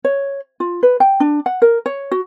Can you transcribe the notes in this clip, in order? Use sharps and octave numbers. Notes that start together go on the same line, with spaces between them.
C#5
F4
B4
G5
D4
F#5
A#4
C#5
F#4